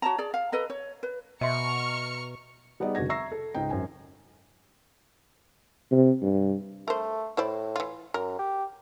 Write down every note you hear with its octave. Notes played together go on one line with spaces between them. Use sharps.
F#4 C#5 A5 A#5
G#4 D5
F5
A4 B4 D#5 A#5
C#5
B4
B2 D#5 E5 A#5 C6 C#6 F6 C#7
G3 B3 D#4 G#4 D5 D#5
F1 D3 F#4 G#6 A#6
E5 A#5 C#6 E6 A#6 C7
A4
C#2 G#2 D#4 G5
G#1 F#2 G#5
C3
G2
A3 A#4 C5
A2 E4 C5 D5
E3 F4
F#2 A#4
G4